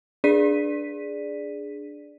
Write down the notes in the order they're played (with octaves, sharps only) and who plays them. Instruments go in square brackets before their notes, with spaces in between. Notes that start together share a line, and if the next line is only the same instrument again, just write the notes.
[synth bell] D4 G#4 D5 B6 D#7